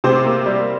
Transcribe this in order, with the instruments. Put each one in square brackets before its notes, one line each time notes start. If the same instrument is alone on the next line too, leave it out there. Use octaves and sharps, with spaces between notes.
[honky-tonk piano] C3 C4 C5
A#3
G3